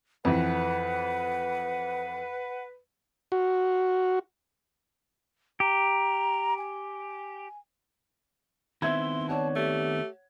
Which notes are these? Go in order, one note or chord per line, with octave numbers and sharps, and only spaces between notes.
F2 E3 B4 F#5
F#4
G4 A#5
G#5
D#3 B3 C4 E4 E5 C6 G#6
C#5 D5 F#5 A5
A3 G4